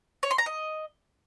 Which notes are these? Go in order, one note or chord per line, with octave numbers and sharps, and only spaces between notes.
C#5
C6
A#5
D#5